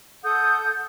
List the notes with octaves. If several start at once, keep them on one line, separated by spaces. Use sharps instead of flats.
A4 F#5 D#6 G6